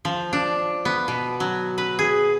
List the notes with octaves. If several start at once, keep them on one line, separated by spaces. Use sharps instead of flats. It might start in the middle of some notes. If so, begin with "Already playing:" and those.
F3
D4
B3
B2
F#3
B4
G#4